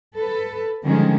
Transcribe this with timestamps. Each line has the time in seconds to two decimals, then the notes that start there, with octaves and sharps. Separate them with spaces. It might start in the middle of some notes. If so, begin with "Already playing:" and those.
0.17 A4 B4
0.84 D3 D#3 F3 G3 G#3 C#4